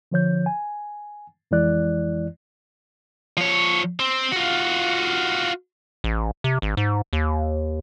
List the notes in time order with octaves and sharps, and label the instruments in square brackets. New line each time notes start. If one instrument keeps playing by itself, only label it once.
[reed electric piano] D3 F3 C#5 G6
G#5
F2 E3 G#3 E4 D5 F#6
[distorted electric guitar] F3 C#5
C4
F4 F#4
[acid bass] A1
C3
G#1
G#2
D#2